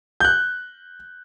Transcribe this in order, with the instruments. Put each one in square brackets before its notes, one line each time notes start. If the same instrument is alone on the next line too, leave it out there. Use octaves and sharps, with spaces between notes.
[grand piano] F#6 G6